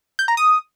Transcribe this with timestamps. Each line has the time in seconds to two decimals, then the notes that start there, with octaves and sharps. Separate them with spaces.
0.19 G6
0.28 A#5
0.37 D#6